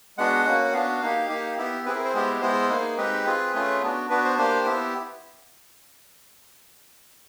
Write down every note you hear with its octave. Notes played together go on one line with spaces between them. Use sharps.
G#3 B3 D4 F#4 F#5
A#3 C#4 F#4
F#5
B3 D4 F#4 F5
A#3 D#4 G4
A#3 D#4 G4
B3 E4 G4
C4 E4 G#4 B4
A#4
C5
G#3 B3 E4 G4
G#3 B3 E4 C5
A#3 D#4 G#4
G#3 C4 D#4 G4 B4
C4 F4 G#4
A3 C#4 F4 G#4
B3 D4 F#4
B3 D4 F#4 B4
C5
A#3 D4 G4 C5
B3 E4 G4